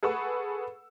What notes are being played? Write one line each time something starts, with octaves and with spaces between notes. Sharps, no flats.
G#4 A4 B4 F#5 C#6 E6